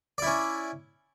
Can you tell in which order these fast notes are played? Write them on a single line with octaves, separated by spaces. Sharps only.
D5 E4 C#4